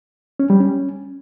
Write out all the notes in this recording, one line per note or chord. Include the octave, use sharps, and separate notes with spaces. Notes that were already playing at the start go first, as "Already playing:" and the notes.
C#4
G3
C#4